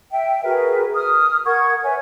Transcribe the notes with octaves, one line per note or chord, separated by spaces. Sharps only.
E5 G5
F#4 G#4 A#4 B4
D#6 F6
A#4 F#5 C#6 G#6
B4 C#5 E5 G#5